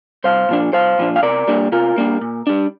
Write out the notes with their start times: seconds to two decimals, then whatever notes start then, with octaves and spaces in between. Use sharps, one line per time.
0.24 C2 C5 F5
0.49 A#2 F3 D4
0.73 C2 C5 F5
0.99 A#2 F3 D4
1.16 F5
1.23 C3 A#4 D5
1.48 G3 A#3 D4
1.72 C3 F4 A#4
1.98 G3 A#3 D4
2.21 A#2
2.47 G3 D4